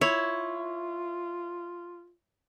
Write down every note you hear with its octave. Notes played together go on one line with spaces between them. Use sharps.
E4 F4 C#5